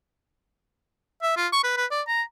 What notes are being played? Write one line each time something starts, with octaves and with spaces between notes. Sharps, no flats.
E5
F4
C#6
B4
B4
D5
A#5